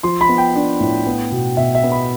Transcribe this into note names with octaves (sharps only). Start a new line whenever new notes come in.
F3 C6
B5
B3
G5
D4
A2
B3
B2
B2 E5
E5
B3
B5